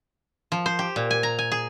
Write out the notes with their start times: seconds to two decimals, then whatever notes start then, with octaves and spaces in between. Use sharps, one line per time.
0.52 F3
0.66 C5
0.79 G4
0.96 A#2
1.11 G#5
1.23 A#5
1.39 G#5
1.52 G#4